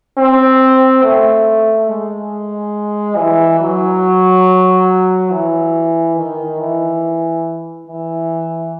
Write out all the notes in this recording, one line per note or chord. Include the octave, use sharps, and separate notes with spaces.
C4
A3
G#3
E3
F#3
E3
D#3
E3
E3